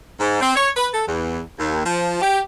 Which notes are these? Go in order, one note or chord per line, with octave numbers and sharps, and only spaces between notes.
G#2
C4
C#5
B4
A4
E2
D#2
F3
G4